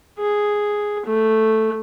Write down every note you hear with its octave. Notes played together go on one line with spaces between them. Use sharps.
G#4
A3